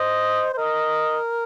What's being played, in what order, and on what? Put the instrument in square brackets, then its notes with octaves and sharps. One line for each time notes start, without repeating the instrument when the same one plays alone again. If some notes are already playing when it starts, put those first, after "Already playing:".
Already playing: [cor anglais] C5 [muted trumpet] D#5
[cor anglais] C5
[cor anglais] A#4 [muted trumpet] D#5